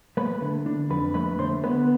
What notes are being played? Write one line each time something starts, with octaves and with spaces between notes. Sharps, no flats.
A3 B4 B5
D3
D4
F2 B4 B5
A3 B4 B5
D3 C5 C6
B3 B4 B5